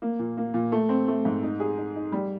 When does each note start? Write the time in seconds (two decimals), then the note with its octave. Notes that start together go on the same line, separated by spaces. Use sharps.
0.02 A#3
0.19 A#2
0.37 A#3
0.54 A#2
0.72 A3
0.89 C4
1.08 A3
1.25 G#2
1.43 D#4
1.60 G#4
1.77 D#4
1.95 D#4
2.12 G3